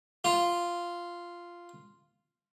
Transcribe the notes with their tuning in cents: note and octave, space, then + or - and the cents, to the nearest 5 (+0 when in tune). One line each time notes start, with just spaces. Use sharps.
F4 -5